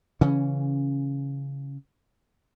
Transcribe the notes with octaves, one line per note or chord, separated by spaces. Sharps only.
C#3 E3 C#4